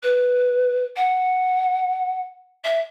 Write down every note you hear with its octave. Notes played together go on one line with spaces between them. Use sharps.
B4
F#5
E5